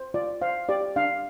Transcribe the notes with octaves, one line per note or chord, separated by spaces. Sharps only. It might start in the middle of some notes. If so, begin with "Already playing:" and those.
Already playing: C5
F4 D5
C5 F5
G4 D5
D4 F5